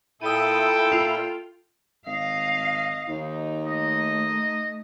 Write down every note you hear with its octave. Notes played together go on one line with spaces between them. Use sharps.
A#2 E4 A4 G5 D#6 D#7
F4
G#1 D#5 F5
D#2 D#4
A3 D#5